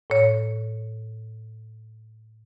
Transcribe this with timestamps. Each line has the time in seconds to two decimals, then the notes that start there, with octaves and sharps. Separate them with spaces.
0.10 A2 C#5